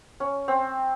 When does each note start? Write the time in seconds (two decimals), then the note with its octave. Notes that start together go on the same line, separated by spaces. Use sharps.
0.20 C#4
0.48 C4